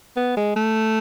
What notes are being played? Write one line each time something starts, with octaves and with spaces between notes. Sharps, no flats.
B3
G#3
A3